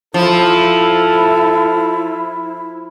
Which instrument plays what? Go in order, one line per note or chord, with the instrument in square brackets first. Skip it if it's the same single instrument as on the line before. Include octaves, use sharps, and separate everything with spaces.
[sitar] F3 [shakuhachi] E4 [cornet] A4